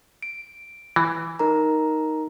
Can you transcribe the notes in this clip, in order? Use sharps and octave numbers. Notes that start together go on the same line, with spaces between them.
D7
E3
D#4 A#4 A#5